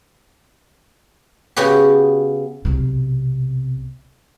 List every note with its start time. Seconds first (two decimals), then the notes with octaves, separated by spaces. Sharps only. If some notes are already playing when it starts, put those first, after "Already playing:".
1.57 C#3 B3 F#4 G4
2.65 B1 C3